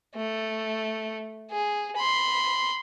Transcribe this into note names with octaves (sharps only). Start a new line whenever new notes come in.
A3
G#4
B5 C6